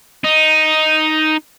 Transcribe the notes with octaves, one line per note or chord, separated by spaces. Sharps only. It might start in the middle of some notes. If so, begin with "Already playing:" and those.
D#4